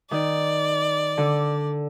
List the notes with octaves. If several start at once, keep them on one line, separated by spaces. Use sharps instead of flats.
D#3 D5
D3